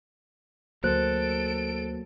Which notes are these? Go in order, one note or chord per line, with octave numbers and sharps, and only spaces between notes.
D2 F#3 A#3 A4 C5 F#6 D7